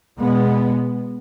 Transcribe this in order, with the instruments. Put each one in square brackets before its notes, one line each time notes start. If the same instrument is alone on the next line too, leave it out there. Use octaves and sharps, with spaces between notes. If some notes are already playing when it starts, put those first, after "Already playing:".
[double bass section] B2 G#3 B3